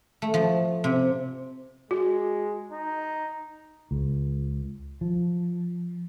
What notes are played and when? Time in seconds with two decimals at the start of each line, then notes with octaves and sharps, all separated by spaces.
0.22 A3
0.34 F3
0.84 C3
1.91 G#3 F#4
2.72 D#4
3.91 C#2
5.01 F3